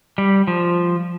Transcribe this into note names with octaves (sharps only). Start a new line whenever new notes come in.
G3
F3